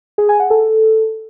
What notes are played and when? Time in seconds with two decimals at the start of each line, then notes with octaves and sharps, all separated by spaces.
0.18 G#4
0.29 G#5
0.40 F#5
0.50 A4